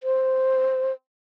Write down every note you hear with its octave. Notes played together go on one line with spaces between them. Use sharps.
C5